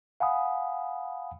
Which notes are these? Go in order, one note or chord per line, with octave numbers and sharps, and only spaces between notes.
F5 F#5 G#5 B5 D#6